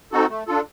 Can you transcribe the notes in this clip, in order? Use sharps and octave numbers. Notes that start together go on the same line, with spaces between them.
C4 D#4 F#4 A4
A3
D4 F4 A4